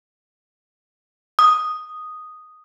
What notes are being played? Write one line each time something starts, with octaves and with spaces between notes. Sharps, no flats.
D#6